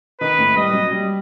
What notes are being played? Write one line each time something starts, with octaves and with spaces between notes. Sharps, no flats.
D#3 D#4 B4
A2 A3
G3 D#5
F#3
G3